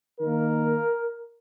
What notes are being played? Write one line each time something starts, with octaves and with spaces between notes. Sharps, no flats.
D#3 A#3 A#4